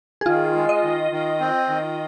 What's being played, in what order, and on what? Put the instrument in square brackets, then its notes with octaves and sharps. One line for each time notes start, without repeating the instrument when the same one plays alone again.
[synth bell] G#4
[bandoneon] D#3 [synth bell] F4
[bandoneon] G#3
[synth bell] D#5
[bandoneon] D#3
D#3
C4
D#3